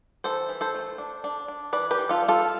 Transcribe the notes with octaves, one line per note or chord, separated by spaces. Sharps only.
E3 A4 C5
E3
A4 C5
A3
D4
D4
D4
E3 B4 D5
G4 B4
E3
F4 A4
G3
F4 A4